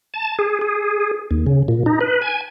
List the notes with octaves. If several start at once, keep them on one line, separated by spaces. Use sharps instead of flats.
A5
G#4
G#4
D#2
C#3
A#2
D#4
B4
G#5